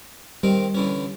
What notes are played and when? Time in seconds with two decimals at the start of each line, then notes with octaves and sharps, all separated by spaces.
0.43 D#3 G3 C4 A#4
0.74 D3 E3 C#4